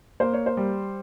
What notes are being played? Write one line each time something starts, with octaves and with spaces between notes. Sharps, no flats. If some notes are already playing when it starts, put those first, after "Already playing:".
A#3 C5
C#5
C5
G3